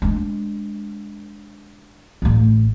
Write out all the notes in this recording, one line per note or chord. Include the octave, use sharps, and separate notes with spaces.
G#3 D4
A1 A3